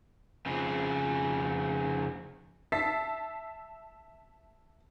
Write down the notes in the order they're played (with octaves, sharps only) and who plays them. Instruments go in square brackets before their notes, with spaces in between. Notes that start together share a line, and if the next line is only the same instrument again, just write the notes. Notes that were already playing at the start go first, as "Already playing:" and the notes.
[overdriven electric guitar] F2 C#3
[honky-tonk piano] E5 A5 A6 B6 C7